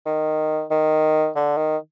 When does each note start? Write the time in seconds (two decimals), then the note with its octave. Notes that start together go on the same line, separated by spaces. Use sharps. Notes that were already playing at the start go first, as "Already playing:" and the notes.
0.06 D#3
0.71 D#3
1.36 D3
1.57 D#3